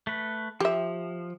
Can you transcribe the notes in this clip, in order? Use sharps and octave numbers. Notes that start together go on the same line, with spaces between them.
A3 B4
F3 G4 E5